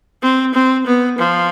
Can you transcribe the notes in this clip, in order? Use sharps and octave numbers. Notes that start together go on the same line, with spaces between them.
C4
C4
B3
F3